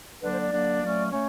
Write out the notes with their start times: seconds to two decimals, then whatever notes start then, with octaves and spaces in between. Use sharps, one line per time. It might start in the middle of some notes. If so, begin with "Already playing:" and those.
0.21 D3 F#3 A#3 D4 B4
0.31 C5
0.41 D5
0.52 D3 F#3 A#3 D4
0.81 A#2 F#3 A3 C#4
1.11 A3 C#4 C#5